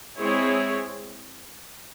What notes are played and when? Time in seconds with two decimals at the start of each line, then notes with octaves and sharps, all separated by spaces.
0.18 G#3 C4 E4 G#4 C#5